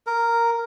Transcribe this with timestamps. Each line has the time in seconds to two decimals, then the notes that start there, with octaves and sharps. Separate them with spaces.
0.07 A#4